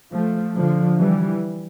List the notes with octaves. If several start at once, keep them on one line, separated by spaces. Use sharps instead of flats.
F3 A3
D3 F3
E3 G3